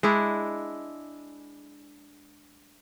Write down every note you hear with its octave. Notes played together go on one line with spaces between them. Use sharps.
G#3 D4 E4